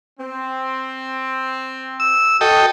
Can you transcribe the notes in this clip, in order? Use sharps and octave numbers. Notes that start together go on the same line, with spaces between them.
C4
E6
F#4 A4 D#5 G5